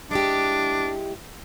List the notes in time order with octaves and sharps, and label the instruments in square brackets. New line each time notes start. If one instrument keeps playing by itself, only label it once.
[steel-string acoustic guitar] G#3 E4 G4 [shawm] D4